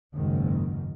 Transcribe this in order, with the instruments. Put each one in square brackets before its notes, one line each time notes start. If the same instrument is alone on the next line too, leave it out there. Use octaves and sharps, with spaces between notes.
[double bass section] F#1 C#2 G#2 D#3